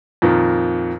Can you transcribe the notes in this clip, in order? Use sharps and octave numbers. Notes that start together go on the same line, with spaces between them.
F2 A#2 D#3